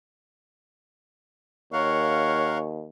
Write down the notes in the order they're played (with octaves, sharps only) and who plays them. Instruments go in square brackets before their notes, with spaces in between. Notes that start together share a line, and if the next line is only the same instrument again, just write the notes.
[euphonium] D#2 [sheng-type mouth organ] A#4 F5 F#5 [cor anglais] C#5